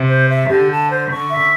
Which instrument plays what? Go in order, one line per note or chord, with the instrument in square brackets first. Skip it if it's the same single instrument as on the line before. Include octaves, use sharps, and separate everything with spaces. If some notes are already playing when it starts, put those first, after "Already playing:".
Already playing: [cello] C3
[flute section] C5
E5
[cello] D3 [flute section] G4
[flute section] A5
C5
[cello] D3 [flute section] C#6
[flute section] E5